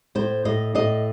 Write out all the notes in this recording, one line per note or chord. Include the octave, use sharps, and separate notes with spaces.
A2 C5
A2 D#5
A2 D#5